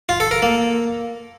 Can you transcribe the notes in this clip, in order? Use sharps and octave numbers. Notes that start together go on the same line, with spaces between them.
F4
A4
A#4
A#3